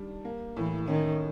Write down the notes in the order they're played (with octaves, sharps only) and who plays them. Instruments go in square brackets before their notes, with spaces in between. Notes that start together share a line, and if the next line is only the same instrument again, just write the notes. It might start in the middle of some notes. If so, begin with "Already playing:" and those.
Already playing: [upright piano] D#3 G3 D4
A#3
[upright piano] A2 [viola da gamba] E3
[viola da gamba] D#3 [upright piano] C#4